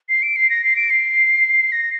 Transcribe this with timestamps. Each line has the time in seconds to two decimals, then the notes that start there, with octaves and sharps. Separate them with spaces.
0.09 C7
0.22 D7
0.36 C7
0.50 A#6
0.64 C7
0.76 D7
0.90 C7
1.72 A#6